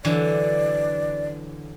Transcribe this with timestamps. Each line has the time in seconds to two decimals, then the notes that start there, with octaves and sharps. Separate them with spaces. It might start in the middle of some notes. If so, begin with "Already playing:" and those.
0.05 D3 E3 F#3 D5